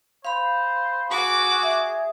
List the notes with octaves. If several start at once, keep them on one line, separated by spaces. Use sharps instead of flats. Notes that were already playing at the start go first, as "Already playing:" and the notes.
C5 F5 B5
F#4 G#4 D6
E5